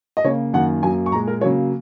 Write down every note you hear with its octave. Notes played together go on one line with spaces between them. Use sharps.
D#5
C#3 A#3 C#5
F#2 D#3 A#3 F#5
F#2 F#3 A#3 G#5
C#6
A#2 G#3 A#5
A#4
C#3 F#3 A#3 C#5